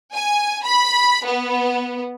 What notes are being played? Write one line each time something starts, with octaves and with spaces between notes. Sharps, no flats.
G#5
B5
B3